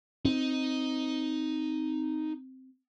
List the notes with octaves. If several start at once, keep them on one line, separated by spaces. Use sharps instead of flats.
C4 D#4